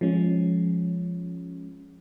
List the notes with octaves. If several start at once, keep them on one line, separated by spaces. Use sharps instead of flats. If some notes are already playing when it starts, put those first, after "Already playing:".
F3 G#3 C#4